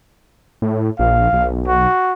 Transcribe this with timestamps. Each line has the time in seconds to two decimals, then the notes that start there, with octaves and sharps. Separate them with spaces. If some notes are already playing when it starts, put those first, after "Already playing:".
0.62 A2
0.99 A#1 F5
1.33 B1
1.67 F#4